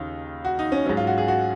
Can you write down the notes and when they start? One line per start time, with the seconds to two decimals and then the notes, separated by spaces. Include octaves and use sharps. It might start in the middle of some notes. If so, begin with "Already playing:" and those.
Already playing: D#2 C#3 D#4 F4
0.45 F#4
0.59 D#4
0.72 C#4
0.86 F#3 C#4
0.89 G#2
0.97 F4
1.07 F#4
1.18 G#4
1.28 F#4